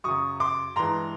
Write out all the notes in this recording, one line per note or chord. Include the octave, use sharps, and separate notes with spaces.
F#2 C#3 F#3 C#6 D#6
C6 D6
G2 E3 G#3 A#5 C6